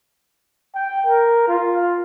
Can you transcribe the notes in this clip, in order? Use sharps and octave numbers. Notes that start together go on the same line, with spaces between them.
G5
A#4
F4